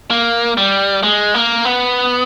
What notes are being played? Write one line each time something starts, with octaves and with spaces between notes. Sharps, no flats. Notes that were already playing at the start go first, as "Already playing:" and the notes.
A#3
G3
G#3
A#3
B3